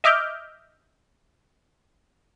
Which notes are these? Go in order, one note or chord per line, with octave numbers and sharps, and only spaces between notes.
D#5 E5 D6 F6 G6